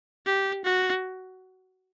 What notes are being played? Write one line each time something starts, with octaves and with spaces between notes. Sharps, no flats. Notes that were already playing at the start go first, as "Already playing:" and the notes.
G4
F#4